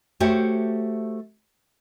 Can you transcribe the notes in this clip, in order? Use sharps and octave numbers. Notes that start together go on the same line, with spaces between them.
A3 F#4 G4 C5 C#5